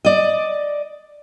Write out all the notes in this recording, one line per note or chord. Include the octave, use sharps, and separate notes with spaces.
D5 D#5